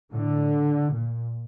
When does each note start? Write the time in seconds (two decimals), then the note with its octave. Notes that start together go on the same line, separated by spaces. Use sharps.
0.12 A2 D3
0.92 A#2